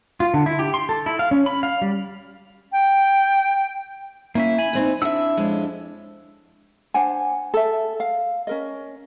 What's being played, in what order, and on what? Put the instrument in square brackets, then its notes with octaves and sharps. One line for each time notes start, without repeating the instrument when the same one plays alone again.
[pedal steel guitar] F4
D3
E4
G4
C6
A4
E4
F5
C#4
B5
F5
G3
[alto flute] G5
[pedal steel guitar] A#3 C#4 E5 [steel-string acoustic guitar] E4
[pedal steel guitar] G#5 B5
[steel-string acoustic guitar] E2 C4 D#4
[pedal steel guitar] D4 E4 E6 [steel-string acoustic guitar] E5 F#5
[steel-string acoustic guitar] F2 G#3 C#4
[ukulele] D4 C5 F#5 G#5
A4 E5
F5
C#4 A#4 D#5